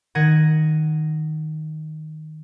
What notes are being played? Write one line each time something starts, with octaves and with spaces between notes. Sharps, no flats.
D#3 F#5 G#6 A#6 D#7